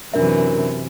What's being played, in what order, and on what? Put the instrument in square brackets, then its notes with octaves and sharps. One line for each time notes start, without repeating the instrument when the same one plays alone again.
[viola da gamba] F#2 C3 E3 [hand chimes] D4 A#4 E5